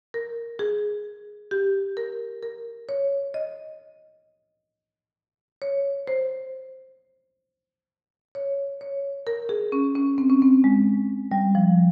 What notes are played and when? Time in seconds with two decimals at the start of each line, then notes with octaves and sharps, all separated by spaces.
0.14 A#4
0.59 G#4
1.51 G4
1.97 A#4
2.43 A#4
2.89 C#5
3.34 D#5
5.62 C#5
6.08 C5
8.35 C#5
8.81 C#5
9.27 A#4
9.49 G#4
9.72 C#4
9.96 C#4
10.18 C4
10.30 C#4
10.42 C4
10.64 G#3
11.32 G3
11.55 F3